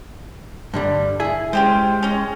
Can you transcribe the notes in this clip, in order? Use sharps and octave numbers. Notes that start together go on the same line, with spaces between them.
G2 D3 G3
E4 G#4 E5
G#3 C#4 G4 C5
C#4 D#5